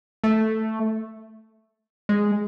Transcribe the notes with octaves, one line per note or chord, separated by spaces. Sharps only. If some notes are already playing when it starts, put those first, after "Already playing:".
A3
G#3